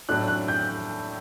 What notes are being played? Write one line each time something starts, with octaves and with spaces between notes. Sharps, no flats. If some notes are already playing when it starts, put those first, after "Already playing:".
A2 F#3 A3 D4 F#6
F#6
G6